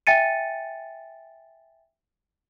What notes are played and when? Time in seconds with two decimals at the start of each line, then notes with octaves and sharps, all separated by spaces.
0.07 E5 G5 G#5 A6 C#7 D#7